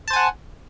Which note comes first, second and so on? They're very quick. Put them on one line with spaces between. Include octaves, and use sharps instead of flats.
A5 C5 G#5 F#5